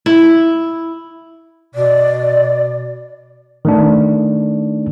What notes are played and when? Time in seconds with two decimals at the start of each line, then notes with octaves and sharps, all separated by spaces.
0.06 E4
1.75 B2 D5
3.65 D#3 A3 D4